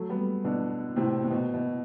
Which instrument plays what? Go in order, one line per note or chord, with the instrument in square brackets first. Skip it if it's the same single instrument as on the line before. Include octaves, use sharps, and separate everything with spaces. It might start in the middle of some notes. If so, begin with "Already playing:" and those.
Already playing: [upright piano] F#3 A3
G3 B3
B2 D3
A2 C3
A2
B2
B2